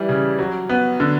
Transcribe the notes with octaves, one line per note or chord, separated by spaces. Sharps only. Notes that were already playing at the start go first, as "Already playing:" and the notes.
Already playing: E3 G3
C#3
F#3
B3
D3